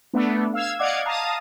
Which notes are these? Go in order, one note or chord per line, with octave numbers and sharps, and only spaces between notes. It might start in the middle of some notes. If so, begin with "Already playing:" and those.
A3 B3 D4
F5 E6 G#6
D5 D#5 F5 F#5 D6 G#6
F5 A5 A#5 D#6